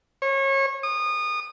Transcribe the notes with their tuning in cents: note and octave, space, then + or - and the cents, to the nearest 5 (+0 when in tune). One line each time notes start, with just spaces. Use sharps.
C#5 -30
D#6 -25